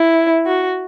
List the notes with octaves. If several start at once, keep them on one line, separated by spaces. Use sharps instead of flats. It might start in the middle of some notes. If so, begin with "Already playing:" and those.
Already playing: E4
F#4